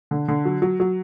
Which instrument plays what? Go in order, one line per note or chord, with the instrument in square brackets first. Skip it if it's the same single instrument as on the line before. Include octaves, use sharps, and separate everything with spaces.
[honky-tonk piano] D3
D3
F#3
F#3
F#3